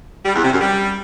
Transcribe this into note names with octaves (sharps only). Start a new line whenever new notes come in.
G3
E2
C3
F#2
G3